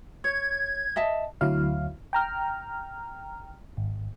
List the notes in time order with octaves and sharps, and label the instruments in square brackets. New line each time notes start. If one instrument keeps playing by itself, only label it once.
[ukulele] C#5 [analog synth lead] G#6
[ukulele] D#5 E5 A5
[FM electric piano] D2 F#3 E4 F5
G5 A#5 F6
G#1